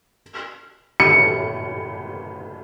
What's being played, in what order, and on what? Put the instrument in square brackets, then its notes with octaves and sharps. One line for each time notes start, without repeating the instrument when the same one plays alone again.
[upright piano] C#7